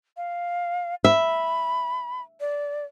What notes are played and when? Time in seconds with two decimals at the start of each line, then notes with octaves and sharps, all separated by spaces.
0.17 F5
1.04 E5 B5
2.40 D5